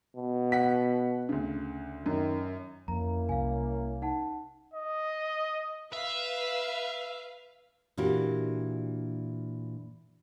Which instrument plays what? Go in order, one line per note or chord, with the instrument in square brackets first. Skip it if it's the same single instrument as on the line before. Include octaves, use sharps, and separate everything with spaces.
[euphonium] B2
[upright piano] F#5 B6
D2 C#3
[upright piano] F#2 [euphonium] D#3
[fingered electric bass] F2 [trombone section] A#3 C#4 E4 [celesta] A#5
[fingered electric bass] C2 [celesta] F5 G#5
[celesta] D#4 F#5 A5
[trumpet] D#5
[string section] B4 F5 [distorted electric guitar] E5
[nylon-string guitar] A#2 E3 D4 F#4 G4